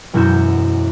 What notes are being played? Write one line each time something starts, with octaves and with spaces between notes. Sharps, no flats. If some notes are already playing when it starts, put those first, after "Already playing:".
E1 F#2 E4 F#4 G6 E7